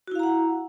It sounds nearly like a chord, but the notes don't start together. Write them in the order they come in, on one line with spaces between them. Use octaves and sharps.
F#4 E4 F5 A#5 F#5